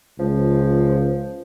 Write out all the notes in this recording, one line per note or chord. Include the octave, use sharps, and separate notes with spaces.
C#2 F3